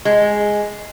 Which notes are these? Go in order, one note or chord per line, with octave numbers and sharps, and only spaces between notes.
G#3